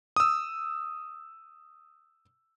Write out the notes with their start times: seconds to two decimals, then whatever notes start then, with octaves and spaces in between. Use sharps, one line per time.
0.16 D#6 E6